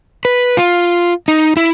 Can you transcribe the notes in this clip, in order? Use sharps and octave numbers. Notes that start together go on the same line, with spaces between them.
B4
F4
D#4
E4